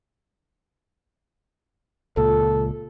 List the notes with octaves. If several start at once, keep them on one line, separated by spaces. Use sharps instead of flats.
C#2 A#2 A4